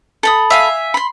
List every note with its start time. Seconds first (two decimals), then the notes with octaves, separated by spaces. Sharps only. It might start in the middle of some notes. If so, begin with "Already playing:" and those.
0.23 A4 B5 D#6
0.50 E5 F5 G#5
0.94 B5 C6